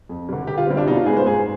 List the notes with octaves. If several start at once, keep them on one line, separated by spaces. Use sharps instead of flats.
F2
D3 G3
D3 G4
F4
G3 C4
D4
B2 D#4
F4
G#3 B3 G#4
C5
G#2 G#4